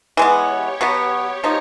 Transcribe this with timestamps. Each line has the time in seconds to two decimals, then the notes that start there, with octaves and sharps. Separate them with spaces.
0.17 E3 G#3 B3 C#5
0.49 G4
0.81 B2 F#3 B3
1.44 F3 A#3 D#4